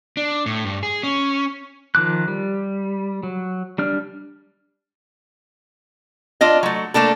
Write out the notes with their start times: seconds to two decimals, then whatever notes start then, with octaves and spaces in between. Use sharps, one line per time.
0.17 D4
0.46 A2
0.65 G2
0.83 G#4
1.03 C#4
1.95 D#3 F3 D6 F#6
2.28 G3
3.23 F#3
3.78 G3 D4 F6
6.41 D4 F4 D#5
6.63 F#3 A3
6.94 A3 A#3 D4 A4